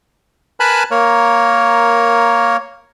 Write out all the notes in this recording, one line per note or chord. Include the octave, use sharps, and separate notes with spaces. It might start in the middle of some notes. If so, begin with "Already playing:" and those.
A#4 B4 G#5 A5 B5 F#6
A#3 A#4 C#5